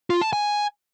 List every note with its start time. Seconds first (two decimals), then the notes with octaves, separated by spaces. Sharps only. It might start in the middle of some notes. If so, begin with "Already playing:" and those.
0.10 F4
0.21 A5
0.33 G#5